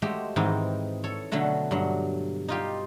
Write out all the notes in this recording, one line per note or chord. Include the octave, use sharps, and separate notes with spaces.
G#3 A3 F#4 G4 C5
G#2 D#3 E3 C4 D#4
A4 C#5
B2 D3 F#3 A3 F#4
G2 F#3
D#4 F4 G4